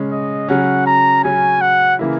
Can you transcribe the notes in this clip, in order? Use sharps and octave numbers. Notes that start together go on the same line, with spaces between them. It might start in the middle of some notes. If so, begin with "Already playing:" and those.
Already playing: C#3 G#3 C#4
D#5
C#3 F#3 C#4 F#5
A#5
C#3 F#3 C#4 G#5
F#5
C#3 E3 A#3 E4